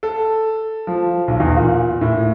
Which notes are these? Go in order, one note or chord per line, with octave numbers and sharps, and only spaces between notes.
A4
F3
B1
E2
A#2
A2